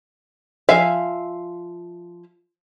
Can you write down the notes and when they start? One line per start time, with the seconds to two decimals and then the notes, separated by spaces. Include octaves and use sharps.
0.69 F3 E5 F5 G#5